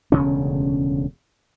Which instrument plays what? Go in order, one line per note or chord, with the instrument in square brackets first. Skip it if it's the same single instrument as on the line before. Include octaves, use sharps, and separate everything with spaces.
[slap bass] E1 D2 C#3 C#4